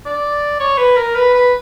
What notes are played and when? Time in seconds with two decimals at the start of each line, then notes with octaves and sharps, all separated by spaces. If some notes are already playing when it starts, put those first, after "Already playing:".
0.06 D5
0.60 C#5
0.78 B4
0.97 A#4
1.15 B4
1.34 B4